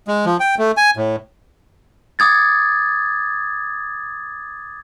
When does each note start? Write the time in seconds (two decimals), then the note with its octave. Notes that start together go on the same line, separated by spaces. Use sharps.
0.08 G#3
0.26 F3
0.40 G5
0.58 A3
0.77 G#5
0.97 A2
2.19 D6 D#6 G#6 A6